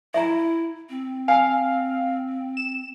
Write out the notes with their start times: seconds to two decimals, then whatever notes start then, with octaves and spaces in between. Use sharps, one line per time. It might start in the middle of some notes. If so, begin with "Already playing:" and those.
0.14 E4 E5 A#5
0.89 C4
1.28 F5 G#5
2.57 E7